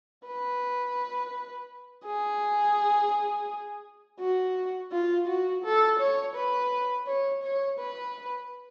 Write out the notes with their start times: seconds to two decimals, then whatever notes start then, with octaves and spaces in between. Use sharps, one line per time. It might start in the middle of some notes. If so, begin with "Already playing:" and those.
0.26 B4
2.05 G#4
4.20 F#4
4.92 F4
5.28 F#4
5.64 A4
5.99 C#5
6.35 B4
7.07 C#5
7.43 C#5
7.79 B4